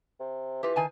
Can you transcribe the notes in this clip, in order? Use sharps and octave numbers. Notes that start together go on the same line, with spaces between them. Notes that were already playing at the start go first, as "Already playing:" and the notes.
C3
E3 F4 G4
D#3 G#5 A5